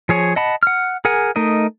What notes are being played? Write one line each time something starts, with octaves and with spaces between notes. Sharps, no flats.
F3 G#4 C#5
D#5 F#5 A5 B5
F#5 F6
G#4 A#4 F#5 G#5
A3 D#4 A#4 D#5